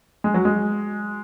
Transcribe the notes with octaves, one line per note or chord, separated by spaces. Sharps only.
G#3
F#3
G#3